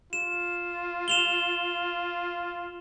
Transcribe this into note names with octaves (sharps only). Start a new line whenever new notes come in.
F4 E7
E7 F7 G7